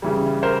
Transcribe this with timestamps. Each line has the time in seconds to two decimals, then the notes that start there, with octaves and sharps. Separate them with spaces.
0.02 C#3 E3 G3
0.43 A#4 C5